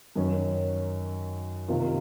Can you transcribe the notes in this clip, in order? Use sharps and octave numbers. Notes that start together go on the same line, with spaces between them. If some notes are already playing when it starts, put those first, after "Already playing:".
F#2 D#3 F#3 C#4
C3 D#3 A#3 F4